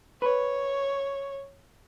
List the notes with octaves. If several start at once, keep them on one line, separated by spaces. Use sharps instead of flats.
B4 C#5